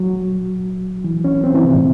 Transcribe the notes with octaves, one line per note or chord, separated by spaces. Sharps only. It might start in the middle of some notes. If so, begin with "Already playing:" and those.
Already playing: F#3
E3
C#4
C4
E3
C3
A2